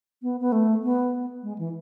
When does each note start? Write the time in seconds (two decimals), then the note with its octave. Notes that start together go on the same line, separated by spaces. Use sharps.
0.23 B3
0.40 B3
0.52 A3
0.83 B3
1.43 G#3
1.58 E3